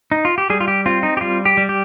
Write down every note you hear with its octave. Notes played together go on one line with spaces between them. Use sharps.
D#4
F4
G4
G3 G#4
F4
G4
C4 F4
D#4
G4
G3 F4
G4
G3
G4